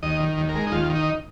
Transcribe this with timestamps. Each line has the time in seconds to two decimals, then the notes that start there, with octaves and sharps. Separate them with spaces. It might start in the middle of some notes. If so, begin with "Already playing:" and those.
0.03 D#2 D#5
0.20 D#3
0.37 D#2
0.49 A#4
0.55 G#3
0.67 D#4
0.72 D#2 F4
0.90 D#3
0.95 D#4